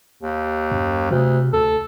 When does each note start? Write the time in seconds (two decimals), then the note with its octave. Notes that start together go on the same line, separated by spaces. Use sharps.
0.22 D#2
0.71 F#2
1.11 D2 C3
1.53 D2 A4